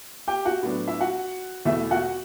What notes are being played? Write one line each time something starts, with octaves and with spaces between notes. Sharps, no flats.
G4 G5
F#4 F#5
A2 F#3 B3 D4
E4 E5
F#4 F#5
E2 B2 A3 E4 E5
F#4 F#5